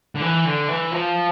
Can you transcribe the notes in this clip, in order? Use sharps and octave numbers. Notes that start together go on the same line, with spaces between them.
D3
E3
D3
E3
F3